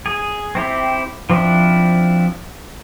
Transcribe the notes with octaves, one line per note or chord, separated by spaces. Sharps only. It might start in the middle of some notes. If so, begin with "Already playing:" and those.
G#4
C4 E4 G4
F3 C4 D4 E4